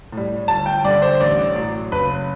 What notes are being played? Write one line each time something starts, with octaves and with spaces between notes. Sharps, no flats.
A2 G3
G1 A5
G5
G2 D3 D5
C5
A1 D5
A2 F#3
F#1 B4